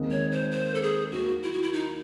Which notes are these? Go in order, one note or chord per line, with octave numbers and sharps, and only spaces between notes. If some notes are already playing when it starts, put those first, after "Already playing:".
Already playing: D#2 D#3 G#3 C4 D#4
C#5
C5
C5
A4
G#4
D#2 D#3 F#3 F#4
E4
F#4
E4
D#4